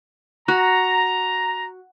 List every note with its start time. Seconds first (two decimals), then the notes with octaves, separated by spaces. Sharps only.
0.48 F#4 A#5